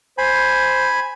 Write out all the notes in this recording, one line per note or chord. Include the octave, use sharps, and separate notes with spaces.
C5 G#5 B5